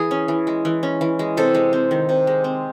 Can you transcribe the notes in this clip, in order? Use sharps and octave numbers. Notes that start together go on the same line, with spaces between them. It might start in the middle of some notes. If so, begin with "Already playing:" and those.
Already playing: E3 G#4
C#4
E3
G#3
E3
C#4
E3
G#3
C3 A4
G#3
C4
D#3
C3
G#3
C4